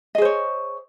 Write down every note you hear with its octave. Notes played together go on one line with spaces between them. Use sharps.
G#4 C5 C#5 D#5